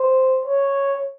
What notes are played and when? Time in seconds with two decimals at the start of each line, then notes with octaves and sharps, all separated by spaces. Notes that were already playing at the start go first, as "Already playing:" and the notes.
Already playing: C5
0.46 C#5